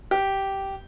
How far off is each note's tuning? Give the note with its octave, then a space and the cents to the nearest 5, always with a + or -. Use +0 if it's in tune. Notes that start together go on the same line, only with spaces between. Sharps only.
G4 -10